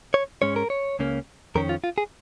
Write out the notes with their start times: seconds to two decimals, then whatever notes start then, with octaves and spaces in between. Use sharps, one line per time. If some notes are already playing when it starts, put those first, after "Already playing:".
0.14 C#5
0.42 G#2 G#3 C#4 C#5
0.56 A#4
0.70 C#5
0.99 C#2 C#3 A#3 C#4
1.55 F2 D#3 C#4 A#4
1.69 F4
1.84 F4
1.98 G#4